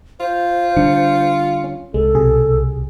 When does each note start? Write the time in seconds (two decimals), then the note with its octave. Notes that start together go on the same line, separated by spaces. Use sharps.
0.20 F4 C5
0.77 D3 G3 D4 C#7
1.64 C#4
1.94 C2 G#3 A4
2.15 B1 C3 G#4